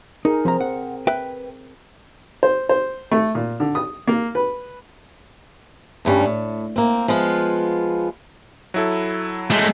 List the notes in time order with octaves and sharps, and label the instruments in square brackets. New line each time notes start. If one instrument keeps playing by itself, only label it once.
[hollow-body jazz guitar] D#4 [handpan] G#4 A#4
[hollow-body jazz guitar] F3 A#5 [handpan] C4
[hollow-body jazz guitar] F#5
B4 E5 G5
[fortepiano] C5
C5
A3
A#2
D3
D#6
A#3
B4
[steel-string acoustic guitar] D2 G2 G3 C#4
A2
A#3 C4
F3 G#3 B3 F4
[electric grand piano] F#3 E4 A4
[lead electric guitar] G#3 A3